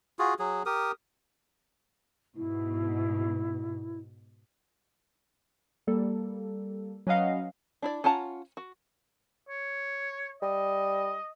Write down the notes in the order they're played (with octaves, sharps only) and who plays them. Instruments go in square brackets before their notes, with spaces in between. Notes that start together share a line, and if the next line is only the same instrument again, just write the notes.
[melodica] F4 F#4 G#4
F#3 G#4
G4 A#4 D#6
[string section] G#2 B2 [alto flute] E4
[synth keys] G3 A#3 A4
F#3 C#4 B4 D#5 F5 F#5
[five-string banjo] D4 E4 D5
C#4 F4 F#5 A5 A#5
F#4
[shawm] C#5
[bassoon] G3 [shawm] D#5